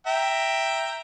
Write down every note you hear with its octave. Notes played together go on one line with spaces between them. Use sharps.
E5 G5 A#5